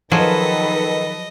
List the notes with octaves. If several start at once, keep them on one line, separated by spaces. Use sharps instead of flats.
D#3 F3 F#3 G#4 A4 B4 D#5